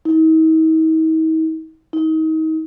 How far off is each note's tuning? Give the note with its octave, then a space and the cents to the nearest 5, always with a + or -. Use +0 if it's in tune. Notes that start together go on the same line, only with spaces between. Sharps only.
D#4 +45
D#4 +30